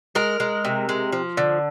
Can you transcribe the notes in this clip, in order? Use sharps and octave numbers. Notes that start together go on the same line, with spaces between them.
G#3 A#4
G#3
C3
G#3
F3
D3